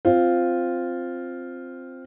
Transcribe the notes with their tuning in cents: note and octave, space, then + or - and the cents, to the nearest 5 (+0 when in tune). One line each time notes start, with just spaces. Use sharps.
C4 +0 F4 +0